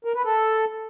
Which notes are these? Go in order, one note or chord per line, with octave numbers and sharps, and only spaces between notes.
A#4
B4
A4